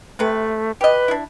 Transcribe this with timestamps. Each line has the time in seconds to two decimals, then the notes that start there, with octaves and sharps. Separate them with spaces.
0.19 C3 A3 B4
0.81 G4 B4 D#5
1.08 D4 E4